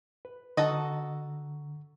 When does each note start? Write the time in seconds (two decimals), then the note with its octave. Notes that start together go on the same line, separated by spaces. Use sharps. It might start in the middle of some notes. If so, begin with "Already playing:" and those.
0.25 B4
0.57 D3 F#4 A4 D#5 A#5